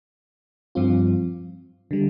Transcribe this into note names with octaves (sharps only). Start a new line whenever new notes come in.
G2 F3 C4 F4
D3 G3